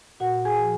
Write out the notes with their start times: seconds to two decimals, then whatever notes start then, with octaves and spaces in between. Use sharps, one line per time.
0.20 A#2 F#4 F#5
0.45 G#4 G#5
0.59 F3